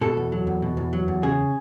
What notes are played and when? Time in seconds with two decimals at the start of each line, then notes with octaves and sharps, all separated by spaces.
0.01 B2 A4
0.17 E2
0.32 F#3
0.47 E2
0.62 B2
0.77 E2
0.93 F#3
1.08 E2
1.23 C#3 G#4